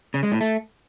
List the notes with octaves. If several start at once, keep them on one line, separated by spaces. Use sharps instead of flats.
C#3
G#3
A2
A3